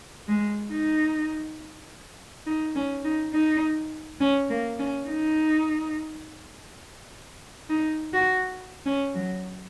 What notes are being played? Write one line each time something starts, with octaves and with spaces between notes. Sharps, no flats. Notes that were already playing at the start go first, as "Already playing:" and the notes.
G#3
D#4
D#4
C#4
D#4
D#4
C#4
A#3
C#4
D#4
D#4
F#4
C#4
F#3